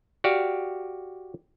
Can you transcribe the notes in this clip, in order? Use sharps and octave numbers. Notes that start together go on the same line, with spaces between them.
F#4 G4 D5 F5